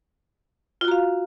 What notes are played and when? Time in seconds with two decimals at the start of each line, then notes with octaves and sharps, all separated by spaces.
0.81 F4
0.85 F#4
0.88 A#5
0.91 F5